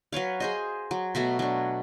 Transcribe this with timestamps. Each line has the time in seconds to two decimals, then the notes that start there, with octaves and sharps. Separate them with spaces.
0.12 F#3 B4 C#5 F5
0.40 G#4 C5 D#5
0.91 F#3
1.15 B2 F#3 A3 F#4
1.39 F#3 D4